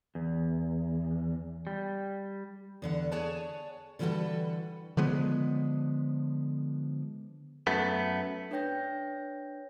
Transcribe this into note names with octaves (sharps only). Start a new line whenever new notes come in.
E2
G3
E2 D3 F#5
G#4 C#5 D5 F#5 G#5 A5
D3 E3 G3 F#4 A4 B4
D3 F3 G#3 B3
F#2 A3 B3
D4 B4 C#5 G5 G6 A#6